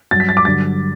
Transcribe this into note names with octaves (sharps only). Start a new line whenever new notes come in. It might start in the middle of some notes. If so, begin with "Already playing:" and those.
G2 F#3 A6
B6
A6
D6
G2 D3 F#3 A6